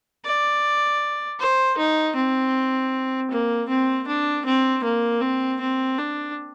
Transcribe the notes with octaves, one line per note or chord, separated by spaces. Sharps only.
D5
C5
D#4
C4
A#3
C4
D4
C4
A#3
C4
C4
D4